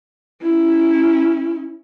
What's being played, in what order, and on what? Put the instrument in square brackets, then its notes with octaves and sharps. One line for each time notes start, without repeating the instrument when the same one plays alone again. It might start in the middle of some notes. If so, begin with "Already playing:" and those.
[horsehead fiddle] C#4 E4